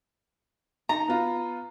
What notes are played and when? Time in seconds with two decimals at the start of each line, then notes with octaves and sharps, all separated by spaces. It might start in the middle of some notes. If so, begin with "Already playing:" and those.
0.89 D#4 A#5
1.08 B3 F4